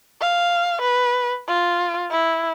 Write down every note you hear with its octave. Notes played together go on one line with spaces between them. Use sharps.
F5
B4
F4
E4